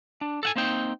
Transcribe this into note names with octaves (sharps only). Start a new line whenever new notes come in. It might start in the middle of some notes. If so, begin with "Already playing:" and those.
D4
A4 F#5 G#5
A#3 C4 D#4 G5